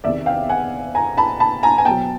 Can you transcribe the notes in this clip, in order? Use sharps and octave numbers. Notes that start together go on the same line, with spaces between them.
E2 C3 D#3 D5 E5
F5 G5
F#5 G#5
G#5 A#5
A5 B5
A5 B5
G#5 A#5
G#5
B2 F#3 G5 A5